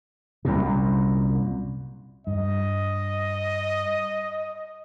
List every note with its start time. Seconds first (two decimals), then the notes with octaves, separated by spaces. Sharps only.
0.45 C2 F#2 A#2
2.27 G2 D#5